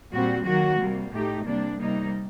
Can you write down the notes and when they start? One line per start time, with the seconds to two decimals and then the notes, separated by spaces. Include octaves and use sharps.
0.12 A#2 G3 C4 F#4
0.45 D#3 F#3 A#3 F#4
0.79 C3 G3 A#3
1.12 A2 A3 D#4 G4
1.46 C3 G3 A#3 D4
1.78 C3 G3 A#3 D#4